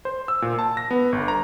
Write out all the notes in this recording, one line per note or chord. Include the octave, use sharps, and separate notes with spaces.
C5
E6
A#2
A5
A#6
B3
G1
A#5